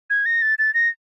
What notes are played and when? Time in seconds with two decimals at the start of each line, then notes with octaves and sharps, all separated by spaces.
0.10 G#6
0.26 A#6
0.42 A6
0.59 A6
0.74 A#6